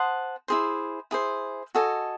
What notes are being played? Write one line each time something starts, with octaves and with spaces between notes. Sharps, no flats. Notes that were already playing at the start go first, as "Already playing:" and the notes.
Already playing: C5 F#5 A5 D#6
E4 G#4 C5
E4 G#4 C5
F#4 A4 D#5 G#5